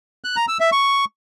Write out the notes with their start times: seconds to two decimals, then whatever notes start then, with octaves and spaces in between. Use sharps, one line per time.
0.24 F#6
0.36 A#5
0.48 E6
0.60 E5
0.72 C#6